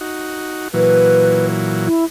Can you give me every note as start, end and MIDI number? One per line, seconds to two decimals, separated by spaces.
0.01 0.68 63
0.01 0.68 66
0.74 1.89 46
0.74 1.89 52
0.74 1.89 54
0.74 1.46 71
1.85 2.05 64